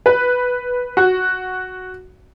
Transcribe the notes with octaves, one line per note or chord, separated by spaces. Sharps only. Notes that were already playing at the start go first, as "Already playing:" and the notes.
B4
F#4